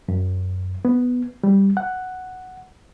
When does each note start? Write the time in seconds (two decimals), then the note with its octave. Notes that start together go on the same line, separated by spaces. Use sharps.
0.08 F#2
0.85 B3
1.44 G3
1.77 F#5